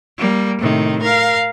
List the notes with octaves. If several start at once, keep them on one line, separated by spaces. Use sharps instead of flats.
G3 A#3
A2 C3 D#3
A#4 F5